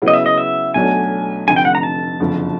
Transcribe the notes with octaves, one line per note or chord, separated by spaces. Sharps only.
C#3 F#3 B3 E4
D#5
E5
D#5
E5
B1 B2 F#3 A3 D4 G#5
F1 F2 D3 G#5
G5
F#5
A#5
A5
F#1 F2 D3 F3